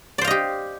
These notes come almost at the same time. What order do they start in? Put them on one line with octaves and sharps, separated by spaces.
D5 C5 F5 D#5 G4